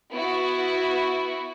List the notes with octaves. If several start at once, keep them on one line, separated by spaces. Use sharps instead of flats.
B3 E4 F#4